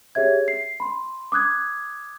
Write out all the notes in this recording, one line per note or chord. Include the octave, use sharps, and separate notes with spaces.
G4 G#4 C#5 E5 G#6
C7
B5 C6
D6 D#6 F#6 G#6